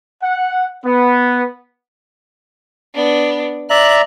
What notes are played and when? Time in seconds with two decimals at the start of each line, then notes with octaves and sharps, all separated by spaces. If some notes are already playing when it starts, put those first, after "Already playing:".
0.22 F#5
0.85 B3
2.95 B3 D4
3.70 D5 E5 A#5 F#6